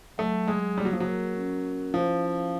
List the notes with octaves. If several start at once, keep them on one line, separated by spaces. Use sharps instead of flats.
F#3 A3
G#3 G#4
G3 A#3
F#3
F3
F#3
A#4
C#4
C#4
F3 E4
F5